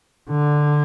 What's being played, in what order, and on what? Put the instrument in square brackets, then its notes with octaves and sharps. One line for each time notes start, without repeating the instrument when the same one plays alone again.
[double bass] D3